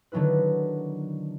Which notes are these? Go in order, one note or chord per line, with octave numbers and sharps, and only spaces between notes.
D3 D#3 F#3 B3 E4 B4